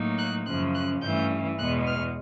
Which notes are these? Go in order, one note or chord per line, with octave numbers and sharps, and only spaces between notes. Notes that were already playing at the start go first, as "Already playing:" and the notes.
Already playing: A2 F#3 A#3 D#4
F#6
F#2 C#3 F3 F#6
F#6
G2 E3 A3 C#4 G6
E2 B2 G#3 B3 F#6
F6